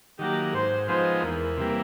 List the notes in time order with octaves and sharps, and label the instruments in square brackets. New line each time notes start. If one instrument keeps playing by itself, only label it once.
[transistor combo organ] D#3 F#3 A#3 [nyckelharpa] G4
[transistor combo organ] G#2 [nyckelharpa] C5
[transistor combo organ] F3 G#3 B3 D#4 [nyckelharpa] C5
[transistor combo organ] E2 [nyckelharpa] A#4
[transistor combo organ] C3 E3 G3 A#3